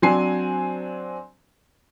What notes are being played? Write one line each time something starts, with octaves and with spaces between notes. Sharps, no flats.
F#3 C4 D4 G#5 C7